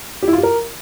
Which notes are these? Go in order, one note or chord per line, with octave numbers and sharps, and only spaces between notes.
G4
E4
F4
G4
A#4